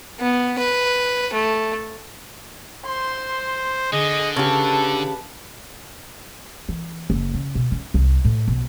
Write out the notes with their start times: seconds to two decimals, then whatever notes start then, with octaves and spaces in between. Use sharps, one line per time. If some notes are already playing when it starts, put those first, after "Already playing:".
0.19 B3
0.59 B4
1.33 A3
2.85 C5 C6
3.93 D3 G#4 D#5
4.36 C#3 G4 A4 B4 A5
6.69 E3
7.10 F#1
7.34 C#3
7.55 B2
7.71 C#4
7.94 C2
8.25 A2
8.48 B1